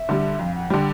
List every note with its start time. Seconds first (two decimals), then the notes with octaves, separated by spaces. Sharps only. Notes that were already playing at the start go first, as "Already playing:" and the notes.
Already playing: E5
0.09 D3 G3
0.39 F2 F5
0.55 F#5
0.70 D3 G3 G5